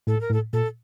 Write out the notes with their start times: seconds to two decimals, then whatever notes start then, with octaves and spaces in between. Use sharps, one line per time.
0.07 A2 A4
0.21 A#4
0.30 A2
0.34 A4
0.53 A#2 A4